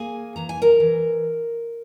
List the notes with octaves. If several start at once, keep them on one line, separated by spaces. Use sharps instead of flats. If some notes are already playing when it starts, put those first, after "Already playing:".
Already playing: A#3 G#4 G#5
E3 A#5
G#5
A#4 A#5
E3